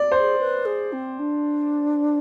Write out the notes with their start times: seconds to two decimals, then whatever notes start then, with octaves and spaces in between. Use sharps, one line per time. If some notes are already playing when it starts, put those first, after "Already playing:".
Already playing: D5
0.12 C5
0.18 G#4
0.38 B4
0.65 G#4
0.92 C4
1.18 D4